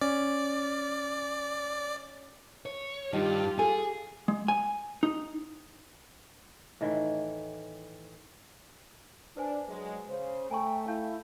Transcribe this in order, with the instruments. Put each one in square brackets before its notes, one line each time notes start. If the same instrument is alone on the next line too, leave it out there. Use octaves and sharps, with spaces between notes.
[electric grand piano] C#4 [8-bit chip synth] D5
[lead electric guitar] C#5
[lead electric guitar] G2 [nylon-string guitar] D#3 [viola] F4 G4
[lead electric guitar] G#4 [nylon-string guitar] A4 G#5
[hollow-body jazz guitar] G#3
G#5
D#4
[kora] A2 D#3 E3
[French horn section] D4 [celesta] B4 C5 G#5
[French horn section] F#3 G#3
C#3 C5
[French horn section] A3 [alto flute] G5 [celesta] G#5 A#5 C#6
[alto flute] E4 [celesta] F5 A5 G6